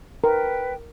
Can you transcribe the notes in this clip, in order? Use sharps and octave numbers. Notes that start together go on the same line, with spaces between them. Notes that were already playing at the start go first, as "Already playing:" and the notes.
A#4 B4 G5